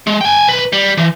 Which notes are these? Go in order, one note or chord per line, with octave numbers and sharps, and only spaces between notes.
G#3
G5 G#5
B1 B4
G3
E3